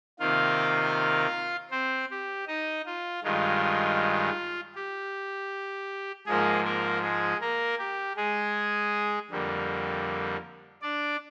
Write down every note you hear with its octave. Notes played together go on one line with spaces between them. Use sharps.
C3 D#3 A#3 F4 F5
C4 C5
G4
D#4 D#5
F4
G2 D#3 G#3 F4
G4
G#2 F3 G#3 A#3 G#4
A#3 A#4
G#3 G#4
A#3 A#4
G4
G#3 G#4
F2 D3 G3 A#3
D4 D5